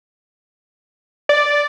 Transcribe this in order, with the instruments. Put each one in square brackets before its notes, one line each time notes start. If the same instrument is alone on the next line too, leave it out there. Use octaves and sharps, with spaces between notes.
[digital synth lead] D5